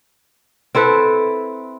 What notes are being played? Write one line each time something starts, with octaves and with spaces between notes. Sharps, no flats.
C4 E4 A4 B4